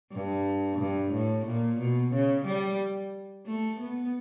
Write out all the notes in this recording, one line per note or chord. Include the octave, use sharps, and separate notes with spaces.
G2
G2
A2
A#2
B2
C#3
G3
A3
B3